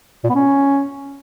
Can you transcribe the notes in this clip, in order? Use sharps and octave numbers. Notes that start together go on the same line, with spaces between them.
A#2
B3
C#4